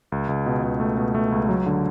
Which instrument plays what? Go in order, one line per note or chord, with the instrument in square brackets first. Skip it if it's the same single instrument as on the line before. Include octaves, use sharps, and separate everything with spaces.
[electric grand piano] C#2
C#2
B2
C#2
A3
B2
A3
C#2
F#3
D3